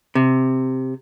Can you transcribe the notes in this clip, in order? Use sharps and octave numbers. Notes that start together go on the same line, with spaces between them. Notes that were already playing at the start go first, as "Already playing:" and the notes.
C3